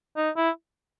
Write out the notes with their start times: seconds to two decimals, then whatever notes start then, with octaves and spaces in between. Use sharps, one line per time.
0.17 D#4
0.36 E4